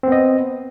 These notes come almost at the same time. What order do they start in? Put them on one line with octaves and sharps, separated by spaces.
C4 B3 D#5